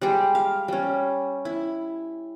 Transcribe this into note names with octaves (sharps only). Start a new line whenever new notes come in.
G3 G#3 G4
F5
G3 C#4
E4